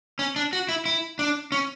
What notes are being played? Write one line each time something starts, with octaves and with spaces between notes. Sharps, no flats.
C#4
D4
F#4
E4
E4
D4
C#4